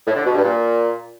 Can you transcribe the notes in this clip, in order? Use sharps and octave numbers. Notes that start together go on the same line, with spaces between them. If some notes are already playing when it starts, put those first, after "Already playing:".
A2
D3
B2
G2
A#2